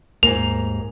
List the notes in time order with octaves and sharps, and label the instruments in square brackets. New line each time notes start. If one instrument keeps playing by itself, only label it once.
[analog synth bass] D#2 [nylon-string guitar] G#2 A#3 [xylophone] F7